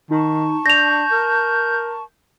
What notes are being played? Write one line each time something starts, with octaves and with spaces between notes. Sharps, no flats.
D#3 D#4 A5 C#6
D4 G6 A#6 F7
A#4